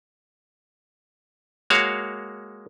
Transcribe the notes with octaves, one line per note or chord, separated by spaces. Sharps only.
G#3 A#3 F#4 C#5 F5